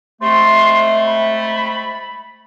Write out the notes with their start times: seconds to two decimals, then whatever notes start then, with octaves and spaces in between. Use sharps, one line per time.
0.21 C3 G#3 A3 C6
1.06 B5